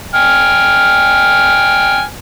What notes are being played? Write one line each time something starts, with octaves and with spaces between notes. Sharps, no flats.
G5 G#5 F6